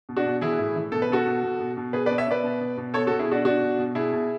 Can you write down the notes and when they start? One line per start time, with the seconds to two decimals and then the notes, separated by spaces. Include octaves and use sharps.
0.09 B2
0.17 D4 F#4
0.26 B2
0.41 E3 E4 G#4
0.58 A2
0.76 E3
0.92 B2 A4
1.02 B4
1.10 B2 F#4 A4
1.27 B2
1.43 B2
1.60 B2
1.77 B2
1.93 B2 G#4 B4
2.06 B4 D5
2.11 B2
2.18 C#5 E5
2.27 B2 B4 D5
2.43 B2
2.60 B2
2.77 B2
2.94 B2 A4 C#5
3.07 B2 F#4 A4
3.19 E4 G#4
3.28 B2 D4 F#4
3.45 B2 D4 F#4
3.61 B2
3.79 B2
3.95 B2 E4 G#4
4.12 B2